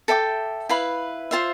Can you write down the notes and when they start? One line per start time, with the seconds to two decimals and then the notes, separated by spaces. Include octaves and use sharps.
0.08 A4 E5 G5 D6
0.69 E4 B4 F5 B5
1.31 F4 C5 E5